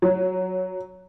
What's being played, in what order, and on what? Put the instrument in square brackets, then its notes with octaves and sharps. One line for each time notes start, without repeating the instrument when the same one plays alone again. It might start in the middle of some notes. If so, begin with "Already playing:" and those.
[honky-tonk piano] F#3